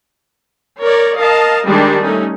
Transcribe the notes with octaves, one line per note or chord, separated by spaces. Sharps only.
A#4 C#5 D5
A#4 D#5 F5 A5
D#3 G3 G#3 D4 G4
A3 C#4 D#4